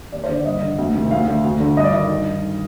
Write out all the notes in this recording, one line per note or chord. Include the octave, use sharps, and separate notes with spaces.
D#2 D5
C5
D3 D5
D5
G2 D#5
D3
D2
C3 D#3
D2 F5
D3
D2
D3
G2 D#5
D5
D#3 D#5
G2
D#3